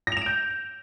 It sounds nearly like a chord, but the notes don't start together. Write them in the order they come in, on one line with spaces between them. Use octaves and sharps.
A#6 F7 E7 D7 G6